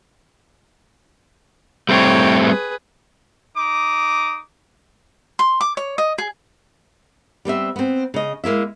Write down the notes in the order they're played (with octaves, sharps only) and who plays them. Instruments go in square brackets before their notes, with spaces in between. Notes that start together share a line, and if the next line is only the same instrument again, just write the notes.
[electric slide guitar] G3 A3 C4 [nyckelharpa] C#5 G5
[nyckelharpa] G#4 B4
[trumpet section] D#4 D6 D#6
[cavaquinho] C6
D6
C#5
D#5
G#4
[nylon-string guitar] G3 B3 C4 E5
B3 C4
C#3 D#5
G#3 A#3 E4 E5